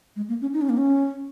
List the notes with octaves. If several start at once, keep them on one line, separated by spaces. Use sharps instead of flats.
G#3
A#3
C#4
D#4
C#4
A#3
C#4